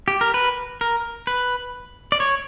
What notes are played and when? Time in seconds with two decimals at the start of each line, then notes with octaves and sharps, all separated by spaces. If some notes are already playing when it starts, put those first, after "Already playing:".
0.08 G4
0.21 A#4
0.34 B4
0.81 A#4
1.27 B4
2.12 D5
2.20 C#5